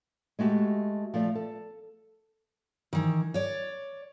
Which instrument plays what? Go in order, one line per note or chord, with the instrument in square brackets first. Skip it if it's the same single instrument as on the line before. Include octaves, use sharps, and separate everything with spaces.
[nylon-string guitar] G#3 A3 F#4 G4
F3 A3 D5
A4
[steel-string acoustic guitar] D#3 E3
C#5 D5